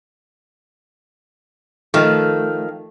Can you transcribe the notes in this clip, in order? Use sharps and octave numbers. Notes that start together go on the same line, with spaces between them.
D#3 F3 A3